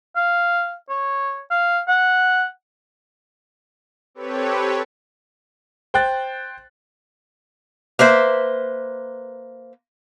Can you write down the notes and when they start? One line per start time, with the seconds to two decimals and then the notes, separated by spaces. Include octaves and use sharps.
0.16 F5
0.89 C#5
1.51 F5
1.88 F#5
4.15 C4 G4 A4 B4 C#5
5.94 C5 G5 F#6 A6
7.99 A#3 B4 C5 E5